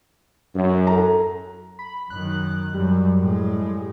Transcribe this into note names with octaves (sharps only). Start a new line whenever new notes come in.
F#2
A4 A#5
B5
F#2 D#3 F#6
F#2 G3
A2 G#3